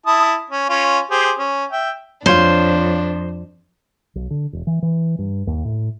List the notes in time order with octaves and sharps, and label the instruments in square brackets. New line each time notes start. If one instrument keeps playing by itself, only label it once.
[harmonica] E4 A5 D#6
C#4
C#4 F4
G4 G#4 C5
C#4
E5 G5
[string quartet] F2 [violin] D4 [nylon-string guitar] F4 C#5 [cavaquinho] C5
[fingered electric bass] B1
D3
E1
E3
E3
G2
D#2
A2